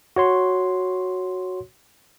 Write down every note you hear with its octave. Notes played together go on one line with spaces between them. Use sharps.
F#4 C#5 C6